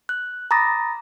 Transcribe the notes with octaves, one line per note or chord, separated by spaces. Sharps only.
F#6
A#5 B5 D6 D#6 A6 A#6